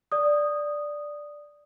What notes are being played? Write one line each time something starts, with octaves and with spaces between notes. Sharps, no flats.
D5 D#6